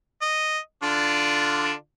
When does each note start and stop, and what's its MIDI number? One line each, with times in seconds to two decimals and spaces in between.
0.22 0.59 75
0.83 1.73 50
0.83 1.73 62
0.83 1.73 65